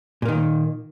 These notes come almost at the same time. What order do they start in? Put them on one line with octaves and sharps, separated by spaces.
A#2 A#3 D#3